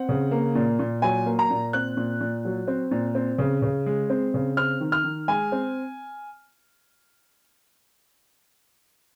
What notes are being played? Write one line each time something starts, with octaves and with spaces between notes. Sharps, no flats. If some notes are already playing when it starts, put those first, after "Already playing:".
Already playing: C4 F#5
C#3
A#3
A#2
A#2
F#3 G#5
A#3
A#5
A#2
C4 F#6
A#2
A#2
F#3
C4
A#2
C4
C#3
C#3
G#3
C4
C#3
C4 F6
D#3
F6
D#3
G#3 G#5
C4